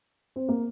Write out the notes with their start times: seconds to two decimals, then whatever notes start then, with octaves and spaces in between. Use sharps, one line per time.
0.36 C4
0.49 A#3